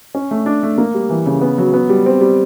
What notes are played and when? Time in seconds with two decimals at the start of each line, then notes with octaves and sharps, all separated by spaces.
0.15 C#4
0.31 A3
0.46 D4
0.63 A3
0.78 A#3
0.94 G3
1.10 E3
1.26 C#3
1.41 B3
1.58 F#3
1.74 B3
1.89 G3
2.06 C4
2.21 G3